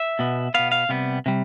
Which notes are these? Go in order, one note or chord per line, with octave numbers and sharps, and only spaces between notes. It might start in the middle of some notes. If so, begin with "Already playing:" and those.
Already playing: E5
B2 B3
B2 B3 F5
F5
C3 G3 B3
C3 G3